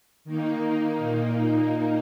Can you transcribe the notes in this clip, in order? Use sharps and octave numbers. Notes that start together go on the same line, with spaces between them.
D#3 A#3 D#4
A#2 A#3 D#4